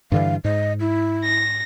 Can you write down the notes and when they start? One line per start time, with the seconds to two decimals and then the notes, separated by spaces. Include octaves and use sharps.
0.12 G2 D3 E3 F5
0.44 G#2 D#5
0.80 E4
1.24 A#6